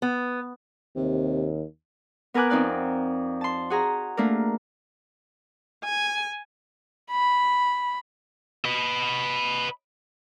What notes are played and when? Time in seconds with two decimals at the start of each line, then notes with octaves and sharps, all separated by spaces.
0.02 B3
0.96 D#2 C3
2.34 B3 A#4 B4 G#5 D6 F#6
2.50 F2 C4 D#4 D5 F#6
3.41 A5 C6
3.70 F#4 G#4 A#5
4.17 A3 A#3 D4 A#4
5.84 G#5
7.11 B5
8.65 B4 D#5